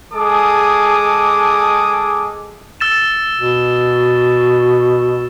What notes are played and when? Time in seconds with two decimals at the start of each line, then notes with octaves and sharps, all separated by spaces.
0.14 G#3 G#4 A4 A5 D6 D#6
2.80 E6 A6 E7
3.34 B2